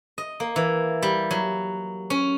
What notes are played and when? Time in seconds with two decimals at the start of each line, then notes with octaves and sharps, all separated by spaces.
0.18 D#5
0.40 A#3
0.56 E3
1.03 G3
1.31 F#3
2.10 C#4